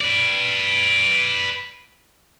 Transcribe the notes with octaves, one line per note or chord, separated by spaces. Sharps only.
B4 D5